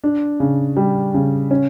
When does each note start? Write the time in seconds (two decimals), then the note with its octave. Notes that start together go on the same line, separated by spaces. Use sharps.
0.04 D4
0.40 C#3
0.77 G3
1.14 C#3
1.51 C#4